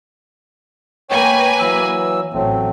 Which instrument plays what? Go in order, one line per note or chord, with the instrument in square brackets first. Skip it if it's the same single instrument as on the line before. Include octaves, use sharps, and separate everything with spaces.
[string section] A#3 B4 G#5 [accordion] C#5 G5
[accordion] E3 F#3 E6
[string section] A1 [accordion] F#3 A3 C4